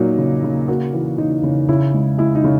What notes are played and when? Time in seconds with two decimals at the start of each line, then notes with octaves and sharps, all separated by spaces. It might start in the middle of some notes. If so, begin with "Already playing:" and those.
Already playing: A#2 F#3 A#3 D#4
0.18 C#3
0.44 C#3
0.68 A#3 F#4
0.94 E3
1.18 C#3 D#4
1.43 C#3
1.69 C#3 E4
1.93 G#3
2.18 G#3 E4
2.35 D#4
2.44 C#3